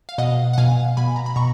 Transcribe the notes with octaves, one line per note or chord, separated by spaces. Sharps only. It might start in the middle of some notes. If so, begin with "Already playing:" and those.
F5
B2 D#5 F#5
F#5
B2 F5 G#5
B2 G#5 B5
A#5
B5
B2 A#5 C#6